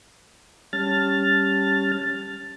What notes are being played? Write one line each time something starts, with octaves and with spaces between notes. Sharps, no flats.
G3 C#4 A5 F6 A6